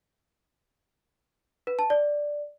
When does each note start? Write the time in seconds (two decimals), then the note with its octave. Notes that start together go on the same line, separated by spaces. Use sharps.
1.67 B4
1.79 A5
1.90 D5